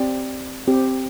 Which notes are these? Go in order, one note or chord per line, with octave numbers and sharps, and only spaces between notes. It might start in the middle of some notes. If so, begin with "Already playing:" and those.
Already playing: C4 G4 D5
C4 G4